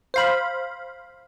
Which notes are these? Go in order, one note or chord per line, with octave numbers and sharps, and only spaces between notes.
C5 F5 B5